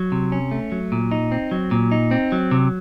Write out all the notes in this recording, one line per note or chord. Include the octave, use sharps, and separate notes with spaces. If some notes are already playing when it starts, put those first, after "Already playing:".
Already playing: F#3
C3
C#4
A3
F#3
A#2
D#4
C4
F#3
A#2
D#4
C4
F#3
C3